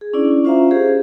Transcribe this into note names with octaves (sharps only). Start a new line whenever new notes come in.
G#4
C#4 D4 E4 D5
C#4 F4 C5 E5 F5 A#5
G4 G#4 C5